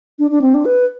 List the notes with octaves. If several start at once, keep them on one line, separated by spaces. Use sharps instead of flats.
D4
D4
C4
D4
B4